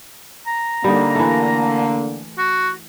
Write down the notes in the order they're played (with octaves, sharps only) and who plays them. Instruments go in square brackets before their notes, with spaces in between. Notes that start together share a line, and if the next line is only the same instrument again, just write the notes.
[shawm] A#5
[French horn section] D3 A#3 [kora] G3 D#4
[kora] E3 A3
[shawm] F#4